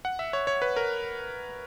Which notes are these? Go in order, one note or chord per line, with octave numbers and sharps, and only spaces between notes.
F#5
E5
C#5
C#5
B4
A#4